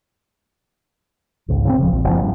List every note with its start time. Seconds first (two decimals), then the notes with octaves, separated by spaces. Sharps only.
1.48 G#1 C#2
1.65 C#3 E3 C4
1.79 D#1 F3
1.92 A#1
2.05 F#1 F3 C4
2.21 G2